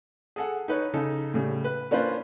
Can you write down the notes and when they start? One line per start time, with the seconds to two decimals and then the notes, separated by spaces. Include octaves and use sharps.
0.36 G#4 A4 F#5
0.68 D#4 B4 C#5
0.93 C#3 D#4 A4
1.34 A2 C#3 G3
1.64 B4
1.91 A#3 C#4 D4 F4 B4 C5